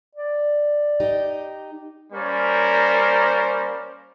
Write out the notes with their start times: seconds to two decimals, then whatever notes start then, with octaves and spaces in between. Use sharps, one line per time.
0.15 D5
1.00 D#4 G4
2.13 G3 A#3 C#4 A#4 C5